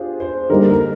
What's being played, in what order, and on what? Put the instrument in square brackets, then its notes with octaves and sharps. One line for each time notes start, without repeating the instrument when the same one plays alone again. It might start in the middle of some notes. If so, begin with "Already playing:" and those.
Already playing: [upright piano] D4 F4 G4 G#4 C5
C5
[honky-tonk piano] D3 G3 A#3 D#4 [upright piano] A#4
[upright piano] A#4